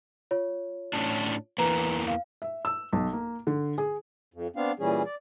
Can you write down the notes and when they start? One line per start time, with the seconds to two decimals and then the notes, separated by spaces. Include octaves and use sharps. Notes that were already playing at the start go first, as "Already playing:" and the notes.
0.31 F4 C#5
0.93 A2 C#4 D4
1.58 E2 E3 A#3 B4 A#5
2.08 F5
2.42 E5
2.65 E6
2.93 B1
3.13 A#3
3.47 D3
3.78 G#4
4.34 F2
4.56 B3 C4 D4 F5
4.79 A#2 E3 G3 C#4 G#4
5.05 D5